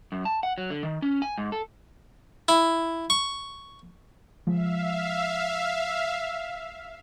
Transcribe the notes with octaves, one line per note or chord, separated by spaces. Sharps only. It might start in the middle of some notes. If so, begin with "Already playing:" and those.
F#2
A5
F#5
F#3
D3
D#3
C#4
G#5
G#2
A4
E4
C#6
F3 G#3 E5 F5